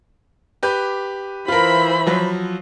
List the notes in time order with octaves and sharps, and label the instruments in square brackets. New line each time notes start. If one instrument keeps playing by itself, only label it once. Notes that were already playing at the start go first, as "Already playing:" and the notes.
[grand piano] G4 B4 G6
[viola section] E3 C5 B5 [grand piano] F4 A#4
[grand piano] F3 F#3